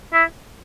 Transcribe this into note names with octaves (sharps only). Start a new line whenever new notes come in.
E4